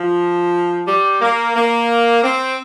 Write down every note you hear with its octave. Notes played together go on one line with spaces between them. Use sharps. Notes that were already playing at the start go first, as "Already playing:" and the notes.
Already playing: F3
G3
A#3
A#3
C4